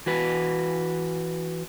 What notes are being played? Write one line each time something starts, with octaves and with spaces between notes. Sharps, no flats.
E3 F#4 B4